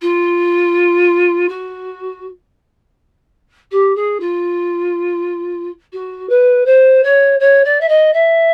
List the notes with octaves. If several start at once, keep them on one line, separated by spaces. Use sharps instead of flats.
F4
F#4
G4
G#4
F4
F#4
B4
C5
C#5
C#5
D5
E5
D#5
E5